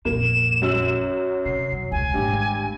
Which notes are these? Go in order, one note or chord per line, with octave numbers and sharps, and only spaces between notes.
A#1 F2 A#3 E7
F#2 F#3 E6 F#7
C3 C7
F#2
E1 C#2 G#5
G#1 G2 A3 G4